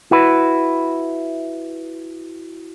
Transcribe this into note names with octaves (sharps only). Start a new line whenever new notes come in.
E4 F#4 B4